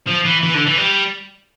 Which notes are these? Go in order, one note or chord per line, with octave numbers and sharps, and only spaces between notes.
F3
E3
E3
D3
E3
G3